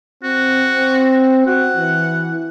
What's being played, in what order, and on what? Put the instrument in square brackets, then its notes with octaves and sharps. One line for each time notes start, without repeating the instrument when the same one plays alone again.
[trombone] C4 [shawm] F#4
[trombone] C4
[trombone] F#4 [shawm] F#5
[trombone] E3